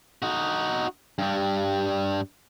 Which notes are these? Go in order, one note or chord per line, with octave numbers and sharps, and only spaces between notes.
D#4 F#4
G2 G3